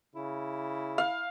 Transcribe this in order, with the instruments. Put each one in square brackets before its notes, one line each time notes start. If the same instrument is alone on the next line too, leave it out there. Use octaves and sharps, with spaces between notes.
[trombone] C#3 [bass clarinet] E4
[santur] F5